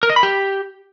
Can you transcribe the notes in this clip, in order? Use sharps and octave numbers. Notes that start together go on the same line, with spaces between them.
A#4
D#5
B5
G4